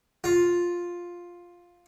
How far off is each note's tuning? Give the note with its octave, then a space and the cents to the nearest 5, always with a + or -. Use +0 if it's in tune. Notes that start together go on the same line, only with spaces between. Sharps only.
F4 +5